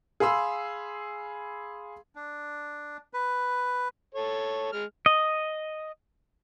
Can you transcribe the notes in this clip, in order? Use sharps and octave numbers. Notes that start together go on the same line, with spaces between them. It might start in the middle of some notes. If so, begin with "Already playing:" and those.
G#4 F5 B5 C6 E6
D4
B4
A4 C#5
G#3 F6
D#5